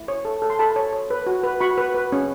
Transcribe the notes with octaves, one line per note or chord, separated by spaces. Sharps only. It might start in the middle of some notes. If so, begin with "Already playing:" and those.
Already playing: E4
C#5
A4
A4
C6
A4 A5 B5
C#5
C#5
B4
F#4
B4
F#4 B5 C#6
B4
B4
C#4